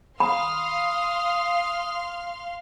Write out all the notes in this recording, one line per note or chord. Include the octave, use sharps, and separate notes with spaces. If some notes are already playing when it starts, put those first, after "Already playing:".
F5 B5 C6 D#6 F6